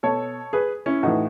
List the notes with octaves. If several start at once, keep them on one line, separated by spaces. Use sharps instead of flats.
B2 A4 C#5
G#4 B4
C#4 E4
A2 E3 D#4 F#4